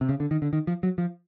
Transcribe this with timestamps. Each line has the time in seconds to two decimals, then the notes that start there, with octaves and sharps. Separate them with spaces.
0.01 C3
0.09 C#3
0.20 D3
0.31 D#3
0.42 D3
0.53 D#3
0.67 F3
0.83 F#3
0.98 F3